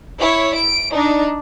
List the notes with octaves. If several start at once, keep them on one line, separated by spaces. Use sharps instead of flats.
E4 C#5
D7
D4 D#4